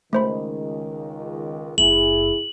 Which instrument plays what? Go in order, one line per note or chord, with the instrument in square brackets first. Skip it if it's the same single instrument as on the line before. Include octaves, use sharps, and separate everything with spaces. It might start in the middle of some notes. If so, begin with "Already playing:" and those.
[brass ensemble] C#2 D#3 [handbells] A3 C5 B5
[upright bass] F#1 [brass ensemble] E4 G#4 [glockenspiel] F#7